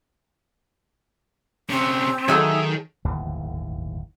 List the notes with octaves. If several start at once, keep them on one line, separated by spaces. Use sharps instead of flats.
C3 C4 C#4
D#3 F#3 G#3 A3 G#4 E5 E6
D1 G1 D#2 E3